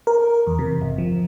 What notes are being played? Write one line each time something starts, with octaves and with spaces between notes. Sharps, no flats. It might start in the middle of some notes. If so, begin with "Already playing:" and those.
A#4
E2
C3
G1
F3